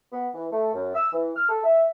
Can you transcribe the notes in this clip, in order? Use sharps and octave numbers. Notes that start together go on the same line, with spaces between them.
B3
E3
A3
F#2
E6
E3
F6
A4
E5